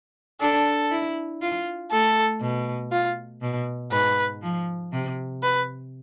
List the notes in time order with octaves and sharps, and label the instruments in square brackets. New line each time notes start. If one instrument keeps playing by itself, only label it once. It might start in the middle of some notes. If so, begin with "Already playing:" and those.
[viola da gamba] D4 [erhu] A4
[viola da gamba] E4
F4
[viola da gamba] A3 [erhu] A4
[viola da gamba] B2
[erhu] F4
[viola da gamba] B2
[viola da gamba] G#2 [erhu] B4
[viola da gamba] F3
C3
[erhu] B4